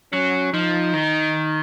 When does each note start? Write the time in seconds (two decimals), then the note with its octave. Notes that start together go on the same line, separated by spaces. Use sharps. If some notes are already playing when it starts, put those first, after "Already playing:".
0.13 F#3 C#4
0.54 F3 D#4
0.94 D#3